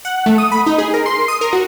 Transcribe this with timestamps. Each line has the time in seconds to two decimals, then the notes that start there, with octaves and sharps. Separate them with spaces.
0.05 F#5
0.26 A3
0.38 D#6
0.52 B5
0.66 D#4
0.78 G#4
0.94 A#4
1.06 C6
1.28 D#6
1.41 A#4
1.53 F#4